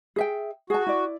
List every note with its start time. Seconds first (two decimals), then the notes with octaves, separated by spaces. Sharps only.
0.16 G#4 E5 G5
0.70 F#4 G#4 A5
0.86 E4 D5